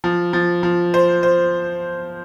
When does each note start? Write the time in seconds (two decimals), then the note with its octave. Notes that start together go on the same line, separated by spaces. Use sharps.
0.04 F3
0.33 F3
0.63 F3
0.94 C5
1.23 C5